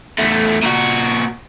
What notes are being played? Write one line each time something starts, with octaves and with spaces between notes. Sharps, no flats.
E2 A3
A#2 F#4